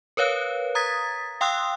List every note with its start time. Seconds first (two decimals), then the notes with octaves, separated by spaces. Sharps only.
0.17 A#4 B4 C#5 F5 F#6
0.75 A#5 D#6 G#6 A6 B6
1.41 F5 G5 C6 D#6 E6 F#6